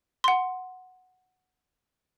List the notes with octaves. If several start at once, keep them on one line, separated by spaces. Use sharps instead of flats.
F#5 C6